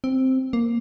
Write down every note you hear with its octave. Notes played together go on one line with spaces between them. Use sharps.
C4
A#3